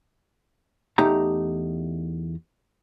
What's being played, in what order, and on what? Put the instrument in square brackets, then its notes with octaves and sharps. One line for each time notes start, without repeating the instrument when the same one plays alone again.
[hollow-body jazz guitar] E2 A3 D#4 G4 A#5